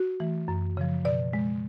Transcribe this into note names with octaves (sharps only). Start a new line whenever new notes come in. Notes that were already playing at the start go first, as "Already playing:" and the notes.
Already playing: F#4
E3 A3
F#2
C#3 F3
B2 D5
G#3